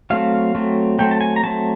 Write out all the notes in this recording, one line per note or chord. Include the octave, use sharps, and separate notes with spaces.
F#3 A3 C4 F5
F#3 A3 C4
F#3 A3 C4 G5
A5
G#5
A#5
F#3 A3 C4 A5